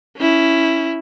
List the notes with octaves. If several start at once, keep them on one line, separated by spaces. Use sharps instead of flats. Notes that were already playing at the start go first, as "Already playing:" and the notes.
C#4 E4